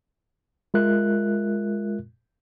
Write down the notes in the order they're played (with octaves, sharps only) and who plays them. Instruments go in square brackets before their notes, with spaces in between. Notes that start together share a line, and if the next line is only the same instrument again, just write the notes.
[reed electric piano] G#3 F4 A#4 E5 F#6